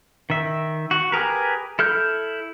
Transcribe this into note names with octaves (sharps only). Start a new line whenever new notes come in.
D#3 E5
F#4
G4 G#4 A#4 B4
E4 A4 F6 G6